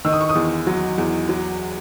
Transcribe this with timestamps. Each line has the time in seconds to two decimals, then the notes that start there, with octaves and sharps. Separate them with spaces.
0.05 D#3 E6
0.13 D#6
0.21 C#6
0.30 D#6
0.35 E2
0.67 F#3
0.98 E2
1.29 F#3